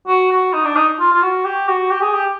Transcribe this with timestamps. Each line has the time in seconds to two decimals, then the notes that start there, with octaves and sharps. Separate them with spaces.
0.07 F#4
0.31 F#4
0.53 D#4
0.64 D4
0.76 D#4
0.99 F4
1.12 F4
1.22 F#4
1.45 G4
1.68 F#4
1.90 G4
2.02 G#4
2.14 G4